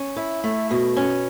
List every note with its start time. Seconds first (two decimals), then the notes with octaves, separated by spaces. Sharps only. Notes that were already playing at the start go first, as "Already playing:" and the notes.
Already playing: C#4
0.16 E4
0.44 A3
0.71 B2
0.97 C#4